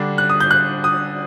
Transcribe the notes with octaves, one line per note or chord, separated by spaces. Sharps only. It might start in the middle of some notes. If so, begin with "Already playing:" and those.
Already playing: D3 G3 D4
F#6
D#6
G6
F#6
D#6